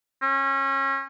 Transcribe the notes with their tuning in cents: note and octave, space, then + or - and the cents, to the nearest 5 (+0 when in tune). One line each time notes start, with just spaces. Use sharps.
C#4 -30